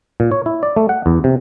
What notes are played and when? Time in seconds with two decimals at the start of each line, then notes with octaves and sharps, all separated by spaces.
0.20 A#2
0.32 C#5
0.46 E4
0.63 D5
0.76 A3
0.89 F#5
1.06 E2
1.24 C3